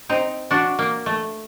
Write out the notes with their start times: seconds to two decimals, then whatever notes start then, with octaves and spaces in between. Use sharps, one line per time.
0.09 C4 D#4
0.51 D4 F#4
0.79 A#3
1.06 A3